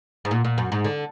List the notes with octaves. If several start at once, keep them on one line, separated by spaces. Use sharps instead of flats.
G#2
A#2
A#2
F#2
G#2
D3